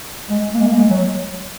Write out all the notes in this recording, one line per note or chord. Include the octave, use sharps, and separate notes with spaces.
G#3
A#3
G#3
A#3
G#3
F#3